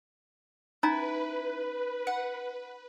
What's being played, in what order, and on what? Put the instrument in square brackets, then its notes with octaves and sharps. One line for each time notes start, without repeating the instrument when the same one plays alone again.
[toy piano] C#4 D#4 A#5 [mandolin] E4 [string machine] B4
[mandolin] F#5